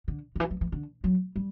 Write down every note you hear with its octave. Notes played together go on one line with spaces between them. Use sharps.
D3
D3
E3
F#3
E3
D3
F#3
G3